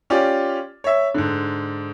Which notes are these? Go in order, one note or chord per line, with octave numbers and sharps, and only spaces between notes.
C#4 F4 G4 D5
C#5 E5
G#2 D3